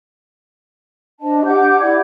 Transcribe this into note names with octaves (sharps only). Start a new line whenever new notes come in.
D4 C5 D#5 A5
G4 F#5 D6 G6
E4 D5 F#5 G#6